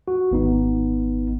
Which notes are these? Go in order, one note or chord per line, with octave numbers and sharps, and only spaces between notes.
F#4
G#1 B3 D#4